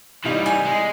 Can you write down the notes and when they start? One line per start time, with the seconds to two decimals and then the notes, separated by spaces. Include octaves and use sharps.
0.25 C3 E3 G3 D#4 F5
0.46 G#5
0.65 G#3